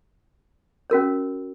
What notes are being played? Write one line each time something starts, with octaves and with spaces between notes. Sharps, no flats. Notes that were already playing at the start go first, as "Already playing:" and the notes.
C#4 F#4 A#4 C#5